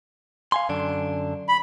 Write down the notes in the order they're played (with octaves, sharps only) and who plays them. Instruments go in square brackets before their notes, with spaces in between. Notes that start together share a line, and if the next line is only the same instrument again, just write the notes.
[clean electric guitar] F5 G#5 C6
F#2 D3 D4
[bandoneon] B5